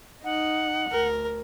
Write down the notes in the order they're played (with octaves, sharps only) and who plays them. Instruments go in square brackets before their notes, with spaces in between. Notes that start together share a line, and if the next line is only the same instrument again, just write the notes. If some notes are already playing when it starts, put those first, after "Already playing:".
[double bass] D#4 [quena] F#5
[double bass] D2 [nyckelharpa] A#4